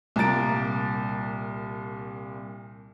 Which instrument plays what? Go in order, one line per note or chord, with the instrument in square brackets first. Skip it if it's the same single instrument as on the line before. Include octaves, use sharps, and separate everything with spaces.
[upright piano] C2 A#2 A#5 A6 D7